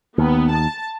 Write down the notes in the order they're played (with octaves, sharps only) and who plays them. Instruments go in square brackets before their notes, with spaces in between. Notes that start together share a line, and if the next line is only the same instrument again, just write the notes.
[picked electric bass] D#2 [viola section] B3
[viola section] A5